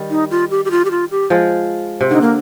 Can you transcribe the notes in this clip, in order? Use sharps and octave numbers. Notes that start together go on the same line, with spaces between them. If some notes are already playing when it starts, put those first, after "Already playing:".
Already playing: D#3 G3
D#4
F4
G4
G4
F4
G4
F4
G4
F3 G#3
C3
D3 D#4
A#3